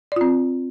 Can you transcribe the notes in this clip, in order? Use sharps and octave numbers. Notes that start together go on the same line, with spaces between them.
C4 F4 D5